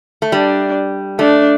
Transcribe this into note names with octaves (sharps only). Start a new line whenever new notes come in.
A3
G3 D4
A3 D4